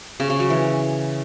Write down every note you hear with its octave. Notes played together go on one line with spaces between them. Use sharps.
C#3
C#3
F#3
E3